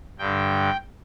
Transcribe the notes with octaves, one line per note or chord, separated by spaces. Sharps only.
G2 D3 G5